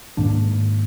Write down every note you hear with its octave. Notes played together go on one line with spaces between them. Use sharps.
G#2 D#3 A#3 D4